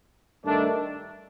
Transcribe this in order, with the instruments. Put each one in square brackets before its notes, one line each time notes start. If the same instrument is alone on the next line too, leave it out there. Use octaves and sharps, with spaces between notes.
[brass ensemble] G2 D#3 A3 D4